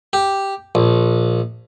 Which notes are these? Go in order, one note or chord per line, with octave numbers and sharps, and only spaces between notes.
G4
A#1